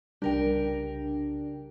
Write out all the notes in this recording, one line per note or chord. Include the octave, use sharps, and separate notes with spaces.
C2 C#3 G3 D4 G4 A#4 G5